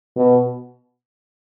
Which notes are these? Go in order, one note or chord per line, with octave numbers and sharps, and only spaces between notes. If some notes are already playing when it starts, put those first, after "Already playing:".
B2